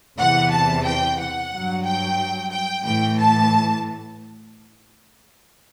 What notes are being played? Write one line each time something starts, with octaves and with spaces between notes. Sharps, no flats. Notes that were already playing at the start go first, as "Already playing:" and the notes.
E2 C3 E3 F#5
A5
G5
F#5
G2 F#3
G5
G5
A2 E3 G5
A5